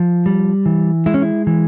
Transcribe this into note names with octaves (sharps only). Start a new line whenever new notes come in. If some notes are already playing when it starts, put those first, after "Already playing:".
Already playing: F3
G3
E3
G#3 E4
C#4
E4
E3